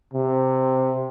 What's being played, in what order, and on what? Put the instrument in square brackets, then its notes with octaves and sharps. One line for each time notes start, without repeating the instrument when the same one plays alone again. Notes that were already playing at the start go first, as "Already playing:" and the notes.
[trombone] C3